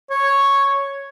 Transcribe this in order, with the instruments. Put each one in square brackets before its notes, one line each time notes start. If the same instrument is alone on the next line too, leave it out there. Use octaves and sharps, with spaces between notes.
[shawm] C#5